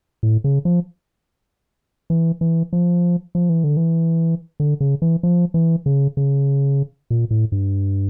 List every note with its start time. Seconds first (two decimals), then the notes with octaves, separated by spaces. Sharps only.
0.23 A2
0.44 C#3
0.65 F3
2.10 E3
2.41 E3
2.73 F3
3.35 F3
3.49 E3
3.64 D3
3.77 E3
4.60 D3
4.80 C#3
5.02 E3
5.23 F3
5.54 E3
5.86 C#3
6.17 C#3
7.10 A#2
7.31 A2
7.52 G2